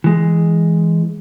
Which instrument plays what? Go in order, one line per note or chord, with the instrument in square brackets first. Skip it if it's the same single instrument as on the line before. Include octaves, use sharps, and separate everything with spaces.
[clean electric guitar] E3 G#3